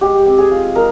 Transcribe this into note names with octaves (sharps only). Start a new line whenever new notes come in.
G#3 G4
C4
G#4
F4
G#3 A#4